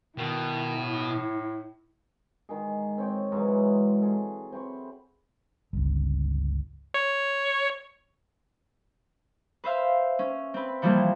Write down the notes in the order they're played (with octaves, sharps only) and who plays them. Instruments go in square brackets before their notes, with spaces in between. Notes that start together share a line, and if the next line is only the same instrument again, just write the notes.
[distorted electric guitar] B2 [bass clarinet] D#3 [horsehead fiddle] E4
[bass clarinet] A2
[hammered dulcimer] D#3 G#3 G#4
C4 C#5 G5
G#2 E3 F#3 G#3
F#5
G#4 A4
C4 B5 C#6
[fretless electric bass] G1 C#2
[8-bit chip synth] C#5
[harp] B4 C5 E5 F5
C#4
C4 B4
C3 E3 F3 G3 A#3